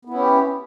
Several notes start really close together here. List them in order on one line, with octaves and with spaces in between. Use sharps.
B3 E4 C#4 G4